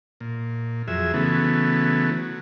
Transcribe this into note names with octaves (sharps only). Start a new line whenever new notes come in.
A#2
F2 F#3 G#4 E5
C#3 E3 F#3 A3 B3
F#3